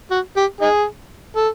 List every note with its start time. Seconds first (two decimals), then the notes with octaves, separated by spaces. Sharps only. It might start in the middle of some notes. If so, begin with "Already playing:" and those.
0.11 F#4
0.37 G4
0.61 D#4 G#4
1.36 A4